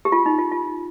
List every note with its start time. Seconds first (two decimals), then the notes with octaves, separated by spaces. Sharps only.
0.05 G4
0.12 F4
0.26 D#4
0.38 F4
0.52 F4